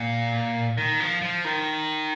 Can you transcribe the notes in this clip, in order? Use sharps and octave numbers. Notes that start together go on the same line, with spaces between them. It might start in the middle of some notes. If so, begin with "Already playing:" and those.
Already playing: A#2
D#3
F3
F3
D#3